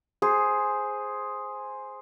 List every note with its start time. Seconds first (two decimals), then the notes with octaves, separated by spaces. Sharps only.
0.22 G#4 C5